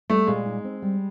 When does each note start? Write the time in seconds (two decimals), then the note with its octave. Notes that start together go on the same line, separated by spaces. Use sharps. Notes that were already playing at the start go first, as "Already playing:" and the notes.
0.10 G3 A3
0.27 A#2 G#3
0.45 D#4
0.64 C4
0.82 G3